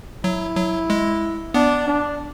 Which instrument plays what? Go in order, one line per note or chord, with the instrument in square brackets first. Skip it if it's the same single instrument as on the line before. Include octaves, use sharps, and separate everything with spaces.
[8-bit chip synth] F#3 [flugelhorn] E4
[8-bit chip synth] F#3
G#3
[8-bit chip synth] B3 [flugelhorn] D4
[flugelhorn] D4